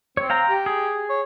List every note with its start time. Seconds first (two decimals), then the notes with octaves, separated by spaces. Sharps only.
0.17 C4 C#5
0.30 F5 G5 A#5
0.49 G4
0.66 G#4
1.10 C#5